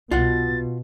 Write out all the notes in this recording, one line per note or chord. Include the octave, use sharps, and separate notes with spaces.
C2 B2 F4 F#5 A6